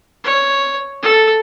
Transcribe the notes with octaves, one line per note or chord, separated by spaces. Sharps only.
C#5
A4